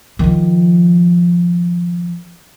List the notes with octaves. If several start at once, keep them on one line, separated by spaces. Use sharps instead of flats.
D#3 F3